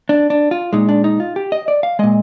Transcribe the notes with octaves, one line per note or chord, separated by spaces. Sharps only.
D4
D4
F4
A#2 G#3 D#4
D4
D#4
F4
G4
D#5
D5
F5
A#2 G#3 D#5